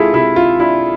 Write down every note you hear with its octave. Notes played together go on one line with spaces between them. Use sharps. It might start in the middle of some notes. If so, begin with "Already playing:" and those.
Already playing: C3 G#3 E4 F4 G#4 A4
C3 E4
F4
D4 E4